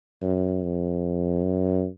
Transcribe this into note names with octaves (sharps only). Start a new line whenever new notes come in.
F#2
F2
F#2